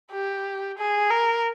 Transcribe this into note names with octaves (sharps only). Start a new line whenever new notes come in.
G4
G#4
A#4